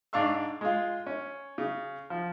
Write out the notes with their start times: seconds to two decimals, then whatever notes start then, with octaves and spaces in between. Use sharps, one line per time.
0.13 G#2 D4 D5 F5 C#6 E6
0.61 G#3 F4
1.06 C#4
1.58 C#3
2.10 F3